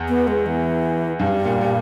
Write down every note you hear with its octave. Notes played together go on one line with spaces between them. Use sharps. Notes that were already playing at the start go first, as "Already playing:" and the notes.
Already playing: E2
B3
G#3
E3
G2 G3
A#2
A#2